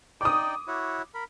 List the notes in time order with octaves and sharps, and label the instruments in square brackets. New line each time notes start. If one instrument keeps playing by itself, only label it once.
[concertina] D#4 D5 G5 [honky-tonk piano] D6 D#6
[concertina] E4 F#4 C#5
A#4 B5